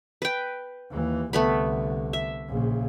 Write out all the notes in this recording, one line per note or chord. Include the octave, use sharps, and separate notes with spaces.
B4 G5
D#2 E3
C2 D3 A3 B3 B5
E5
A#1 C#3